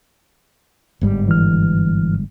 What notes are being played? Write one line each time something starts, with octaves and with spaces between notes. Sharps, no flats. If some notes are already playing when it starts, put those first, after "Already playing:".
G1 G#2 G3
E3 F6